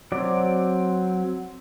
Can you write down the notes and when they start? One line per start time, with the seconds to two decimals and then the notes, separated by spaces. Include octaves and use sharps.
0.12 F#3 C4 D5